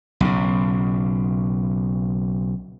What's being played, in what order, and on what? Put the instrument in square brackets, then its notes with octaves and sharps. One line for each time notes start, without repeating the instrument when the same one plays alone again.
[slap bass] B1 C#3